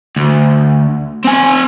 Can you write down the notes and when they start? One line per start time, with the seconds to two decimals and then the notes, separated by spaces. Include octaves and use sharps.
0.16 D2
1.25 C4 G#5